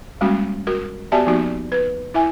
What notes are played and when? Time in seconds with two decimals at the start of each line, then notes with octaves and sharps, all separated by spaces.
0.21 G3 G#3 A#3 C#4 F#4
0.67 F#4 A#4
1.12 B3 F#4 G4 D5 E5 A5
1.26 F3 A#3 B3 D#4 F#4
1.72 B4
2.14 E4 E5 G#5